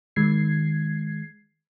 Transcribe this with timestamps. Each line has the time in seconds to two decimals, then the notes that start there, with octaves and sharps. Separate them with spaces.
0.16 D#3 G#3 G#6 C7